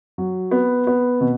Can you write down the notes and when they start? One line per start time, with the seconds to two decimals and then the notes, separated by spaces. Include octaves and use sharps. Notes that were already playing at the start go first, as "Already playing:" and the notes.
0.18 F#3
0.51 B3
0.87 B3
1.21 B2